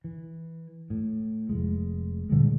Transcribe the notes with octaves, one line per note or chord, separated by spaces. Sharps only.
E3
A2
F1 G#3
A#2 D3 G3 G#3